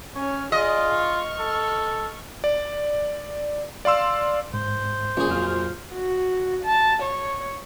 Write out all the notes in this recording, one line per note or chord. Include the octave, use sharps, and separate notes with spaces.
C#4 C#5 F6
F4 G#4 D5 D#5
C#6 F6
A4
D5
D5 F5 C6 E6
G#2 C5
A#1 C#3 F4 G#4
F2 F#3 F6
F#4
A5
C#5